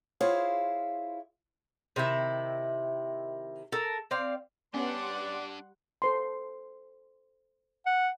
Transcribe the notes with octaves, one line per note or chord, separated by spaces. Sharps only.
E4 F4 G#4 C5 C#5 F5
C3 D#3 E4 E5
A4 A#4
C4 D5 F5
G3 B3 C#4 D4 G4 D5 F#5 C6
A4 C5 C6
F#5